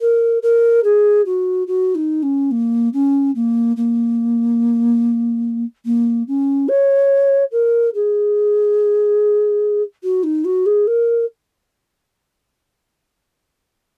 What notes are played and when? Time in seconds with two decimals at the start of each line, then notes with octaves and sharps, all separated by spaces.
0.01 A#4
0.42 A#4
0.84 G#4
1.25 F#4
1.67 F#4
1.95 D#4
2.22 C#4
2.51 A#3
2.93 C#4
3.35 A#3
3.76 A#3
5.85 A#3
6.27 C#4
6.68 C#5
7.52 A#4
7.94 G#4
10.03 F#4
10.23 D#4
10.44 F#4
10.66 G#4
10.87 A#4